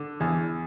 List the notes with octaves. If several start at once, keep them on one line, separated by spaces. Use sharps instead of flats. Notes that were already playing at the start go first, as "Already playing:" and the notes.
Already playing: D3
E2